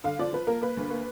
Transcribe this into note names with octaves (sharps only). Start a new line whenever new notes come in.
D3 F5
F3 D5
F3 B4
A#3 A#4
A#3 B4
D2
A#3